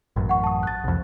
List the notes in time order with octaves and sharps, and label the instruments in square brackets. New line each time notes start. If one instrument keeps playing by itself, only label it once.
[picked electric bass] A1 F#2
[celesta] F#5 C#6
A5 D#6
F#6 A6
[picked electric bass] C2 F2